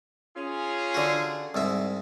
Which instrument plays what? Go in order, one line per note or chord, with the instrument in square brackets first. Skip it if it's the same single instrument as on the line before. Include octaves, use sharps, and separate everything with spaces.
[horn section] C#4 F4 G#4
[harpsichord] D3 F#4
C2 G#2 E5